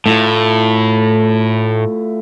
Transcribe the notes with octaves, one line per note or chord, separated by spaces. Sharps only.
A2 A3 E4 F4